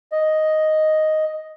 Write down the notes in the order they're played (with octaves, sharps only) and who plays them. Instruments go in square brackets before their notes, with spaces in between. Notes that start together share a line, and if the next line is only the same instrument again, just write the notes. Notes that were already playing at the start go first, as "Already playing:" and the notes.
[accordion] D#5